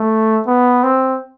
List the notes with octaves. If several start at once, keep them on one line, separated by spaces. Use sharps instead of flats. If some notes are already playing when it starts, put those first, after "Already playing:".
Already playing: A3
B3
C4